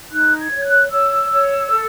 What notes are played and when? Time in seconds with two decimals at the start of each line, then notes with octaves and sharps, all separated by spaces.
0.11 D#4 F#6
0.37 G#6
0.51 C#5
0.64 F#6
0.91 C#5 E6
1.30 C#5
1.70 A4